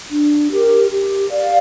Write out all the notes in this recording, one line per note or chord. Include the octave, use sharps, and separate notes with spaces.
D4
G4 A#4
G4
D5 F5